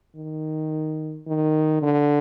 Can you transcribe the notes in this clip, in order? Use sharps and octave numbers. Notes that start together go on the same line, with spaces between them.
D#3
D#3
D3